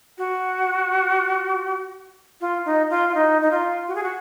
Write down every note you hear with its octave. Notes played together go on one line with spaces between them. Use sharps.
F#4
F4
D#4
F4
F4
D#4
D#4
F4
F#4
G#4
F#4